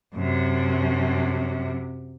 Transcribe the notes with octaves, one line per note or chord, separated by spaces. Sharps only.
F#2 C3